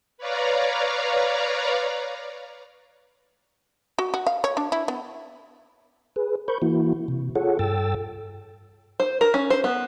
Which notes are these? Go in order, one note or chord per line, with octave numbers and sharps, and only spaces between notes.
B4 C#5 D5 F5 A#5
F#4
F#4
F5
C#5
D4
E4
B3
G#4 B4
A#4 C5 B5 C#6 G6
E3 A#3 E4 F#4
C3
F4 G#4 A4 C#5 F#5
G2 A4 G5 E6 A6
C5
A#4
C#4
C5
B3